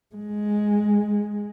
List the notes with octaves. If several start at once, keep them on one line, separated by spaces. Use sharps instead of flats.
G#3